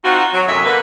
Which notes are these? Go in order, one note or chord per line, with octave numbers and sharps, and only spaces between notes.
C4 D#4 F4 F#4
F#3
F#2 C3 A3 C#5 D#5 E5
D3 A#3 B3 B4